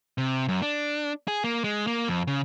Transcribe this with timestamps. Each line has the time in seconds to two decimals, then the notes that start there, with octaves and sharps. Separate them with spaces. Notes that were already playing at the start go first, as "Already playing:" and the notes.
0.18 C3
0.48 F#2
0.62 D4
1.28 G#4
1.44 A#3
1.64 G#3
1.87 A#3
2.08 F2
2.27 C#3